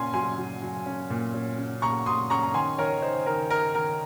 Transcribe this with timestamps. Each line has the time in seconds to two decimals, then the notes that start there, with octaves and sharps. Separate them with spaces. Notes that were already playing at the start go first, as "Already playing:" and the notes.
Already playing: A#2 C#4 G#5 C6
0.14 F#3 G#5 C6
0.38 F#3
0.62 F#3
0.86 C#4
1.10 A#2
1.34 C#4
1.58 C#4
1.82 A#2 A#5 C#6
2.06 F#3 C6 D#6
2.30 C#4 A#5 C#6
2.43 A#5
2.54 D#3 G#5 C6
2.78 D#3 A#4 C#5
3.02 D#4 C5
3.26 D#3 A#4
3.50 D#4 A#4
3.75 D#3 A#4